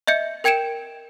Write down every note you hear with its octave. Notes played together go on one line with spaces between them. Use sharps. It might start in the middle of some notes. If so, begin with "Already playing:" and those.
D#5 E5 G6 C#7
A#4 G5 G#6 C#7 D7 E7